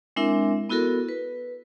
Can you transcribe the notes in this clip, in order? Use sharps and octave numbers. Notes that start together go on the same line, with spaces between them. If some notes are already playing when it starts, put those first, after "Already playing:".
G#3 C4 D4 E4 A#4 E5
B3 E4 F#4 A4 A#4
B4